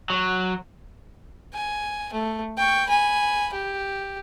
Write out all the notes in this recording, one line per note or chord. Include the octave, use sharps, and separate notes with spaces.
F#3
G#5
A3
G5 C#6
G#5 B5
G4